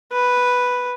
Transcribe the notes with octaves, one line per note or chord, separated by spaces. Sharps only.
B4